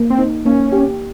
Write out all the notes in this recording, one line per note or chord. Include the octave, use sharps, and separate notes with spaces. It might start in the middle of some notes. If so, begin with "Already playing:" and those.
Already playing: A#3
C4
D#4
A#3 C#4
G4